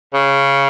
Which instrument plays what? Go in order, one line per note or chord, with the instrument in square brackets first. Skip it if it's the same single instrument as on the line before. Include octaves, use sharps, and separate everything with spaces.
[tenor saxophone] C#3